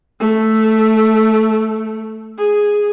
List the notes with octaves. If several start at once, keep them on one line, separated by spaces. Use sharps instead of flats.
A3
G#4